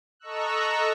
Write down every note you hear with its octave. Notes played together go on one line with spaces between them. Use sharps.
A4 D#5 A#5 C#6 E6 F#6